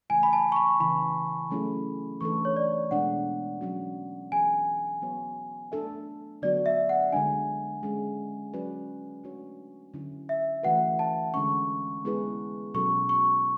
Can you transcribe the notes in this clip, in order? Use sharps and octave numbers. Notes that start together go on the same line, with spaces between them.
C#3 E3 A3 E4 G#5
B5
A5
C#6
B5
C#3 E3 B3 E4 B5
F#3 A3 C#4 E4 G#4
E3 A3 D4 A4 C#6
C#5
D5
B2 G#3 B3 D4 F#5
F#3 C#4 F#4
E3 B3 D4 G#4 G#5
F#3 B3 F#4 C#5
A3 D4 A4 E5
D3 F#3 B3 F#4 D5
E5
F#5
D3 G#3 D4 G#5
G#3 C#4 G#4
F#3 C#4 F#4 B4 D5
A3 D4 F#4 C#5
D3 F#3 C#4 E4
E5
E3 A3 C#4 F#4 B4 F#5
A5
D3 G#3 C#4 C#6
G#3 B3 E4 G#4 B4
B2 F#3 C#4 F#4 A4 C#6
C#6